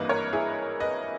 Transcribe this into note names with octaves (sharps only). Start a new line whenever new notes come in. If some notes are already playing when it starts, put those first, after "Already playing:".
Already playing: G#1 G2 E3 A#3 B4 D#5
A#4 C#5
E4 G#4
B4 D#5